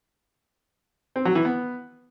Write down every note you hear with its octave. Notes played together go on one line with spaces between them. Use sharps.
C4
F#3
E3
B3